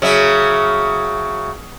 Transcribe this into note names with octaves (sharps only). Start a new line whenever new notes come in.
C#3 F#3 E5